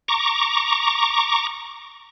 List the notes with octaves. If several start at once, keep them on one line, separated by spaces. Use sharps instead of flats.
A#5 C#6 D6